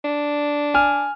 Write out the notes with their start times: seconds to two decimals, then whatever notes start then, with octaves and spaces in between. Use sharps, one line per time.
0.05 D4
0.74 G#5 F6